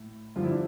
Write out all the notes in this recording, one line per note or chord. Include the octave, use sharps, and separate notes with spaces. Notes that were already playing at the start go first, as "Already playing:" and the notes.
Already playing: A2
G2 D3 F3 F4
E4
D4